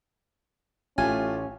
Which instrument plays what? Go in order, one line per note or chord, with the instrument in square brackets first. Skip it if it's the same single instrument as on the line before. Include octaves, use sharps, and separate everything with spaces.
[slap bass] A1 [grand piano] A3 F4 G4 [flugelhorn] C#4 [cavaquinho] G#5